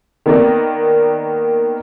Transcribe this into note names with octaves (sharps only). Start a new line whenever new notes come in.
D#3 A#3 B3 A#4 D5 D#5